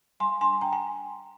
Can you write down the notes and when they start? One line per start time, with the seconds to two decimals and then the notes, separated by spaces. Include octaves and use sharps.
0.20 G3 G#5 C6
0.41 D4 G#5 C6
0.61 D4 G5 A#5
0.73 G#5